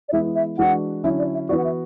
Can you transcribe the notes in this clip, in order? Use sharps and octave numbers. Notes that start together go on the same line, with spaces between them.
D5
E3 G#3 B3 E4 E5
E5
E3 G#3 D4 F#4 F#5
D3 F#3 C#4 E4 E5
D5
E5
E3 B3 F#4 D5
F#5
E5